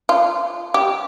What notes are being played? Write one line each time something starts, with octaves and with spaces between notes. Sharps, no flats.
F4
G4